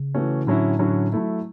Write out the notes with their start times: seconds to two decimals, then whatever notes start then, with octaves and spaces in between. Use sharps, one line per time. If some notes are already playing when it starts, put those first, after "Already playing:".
Already playing: C#3
0.15 E3 A3 C#4 F#4
0.47 A2 D3 F#3 C#4 E4
0.79 D3 F#3 C#4 E4
1.12 F#3 A3 E4